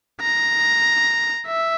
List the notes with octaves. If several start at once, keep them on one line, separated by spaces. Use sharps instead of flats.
A#5
E5